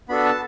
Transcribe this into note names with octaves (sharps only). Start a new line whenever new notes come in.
B3 D4 F#4 A4 B5
A5